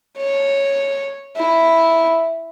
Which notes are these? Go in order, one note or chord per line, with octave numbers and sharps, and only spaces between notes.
C#5
E4